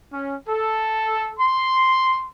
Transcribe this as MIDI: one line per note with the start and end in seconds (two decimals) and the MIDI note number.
0.12 0.36 61
0.47 1.33 69
1.39 2.26 84